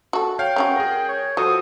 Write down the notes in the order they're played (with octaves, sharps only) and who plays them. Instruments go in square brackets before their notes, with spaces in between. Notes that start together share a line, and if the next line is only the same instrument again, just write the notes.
[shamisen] F#4 A4
[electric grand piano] C#5 F5 F6 [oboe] G5
[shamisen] G#3 C#4 F#4
[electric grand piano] G#4 A#4
[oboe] C#5
[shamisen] F3 [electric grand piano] F#4 A4 C5 [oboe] D#6